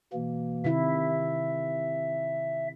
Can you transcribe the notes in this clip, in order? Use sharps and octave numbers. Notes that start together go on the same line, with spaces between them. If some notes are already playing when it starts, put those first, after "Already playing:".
B2 E3 A#3
C3 D#3 E4 E5